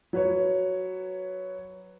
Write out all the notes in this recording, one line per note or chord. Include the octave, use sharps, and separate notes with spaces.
F#3 B4 C#5